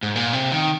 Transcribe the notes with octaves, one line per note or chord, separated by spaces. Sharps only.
G#2
A#2
C3
D#3